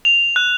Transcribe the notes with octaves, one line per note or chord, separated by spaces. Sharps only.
F7
F#6